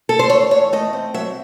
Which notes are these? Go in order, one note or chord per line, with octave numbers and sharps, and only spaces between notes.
A4
C5
A3 C#5
E2 C#5
A3 D#5
C4
F#3 E5